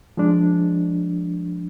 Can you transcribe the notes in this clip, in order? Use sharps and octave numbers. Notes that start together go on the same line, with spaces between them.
F3 G#3 D4